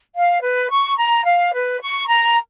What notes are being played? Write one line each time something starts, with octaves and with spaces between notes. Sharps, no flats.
F5
B4
C#6
A#5
F5
B4
C#6
A#5